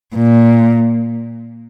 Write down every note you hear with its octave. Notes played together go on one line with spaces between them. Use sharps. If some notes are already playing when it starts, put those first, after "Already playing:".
A#2